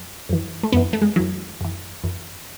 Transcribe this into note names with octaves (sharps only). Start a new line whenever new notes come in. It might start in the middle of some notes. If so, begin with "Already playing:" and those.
Already playing: F#2
F#2 E3
A3
F#2 E3 B3
A3
G#3
F#2 E3 F#3
F#2 E3
F#2 E3